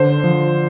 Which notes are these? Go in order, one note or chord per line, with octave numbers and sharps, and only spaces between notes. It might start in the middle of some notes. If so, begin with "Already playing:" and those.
Already playing: D3 C5
F3